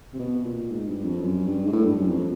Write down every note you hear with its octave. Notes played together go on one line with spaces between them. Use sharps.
C3
B2
A#2
G#2
G2
F2
F#2
G2
G#2
A2
G2
F#2
F2